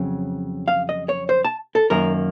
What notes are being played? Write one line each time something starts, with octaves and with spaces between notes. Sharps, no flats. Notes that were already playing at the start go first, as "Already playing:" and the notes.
Already playing: F2 C#3 F#3
F5
D#5
C#5
C5
A5
A4
F#2 D#3 A#3 A#4